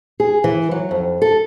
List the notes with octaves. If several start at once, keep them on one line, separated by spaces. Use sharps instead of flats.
G#4
E3
F#3
F2
A4